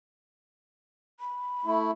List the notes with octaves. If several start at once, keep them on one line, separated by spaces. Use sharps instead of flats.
B5
A3 E4